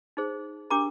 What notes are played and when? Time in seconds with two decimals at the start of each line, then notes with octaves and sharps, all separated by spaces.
0.17 D#4 G#4 C5
0.70 D4 G4 A#4 A#5 D6